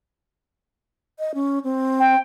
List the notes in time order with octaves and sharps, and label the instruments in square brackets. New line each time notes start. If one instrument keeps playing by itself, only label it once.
[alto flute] D#5
C#4
C4
[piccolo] G5